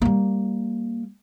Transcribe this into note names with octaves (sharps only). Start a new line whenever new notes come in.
G3 A#3